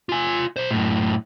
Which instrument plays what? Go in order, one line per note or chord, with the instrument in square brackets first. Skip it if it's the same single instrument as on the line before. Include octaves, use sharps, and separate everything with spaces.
[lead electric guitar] F4 G#5
B1 C5
F#2 A2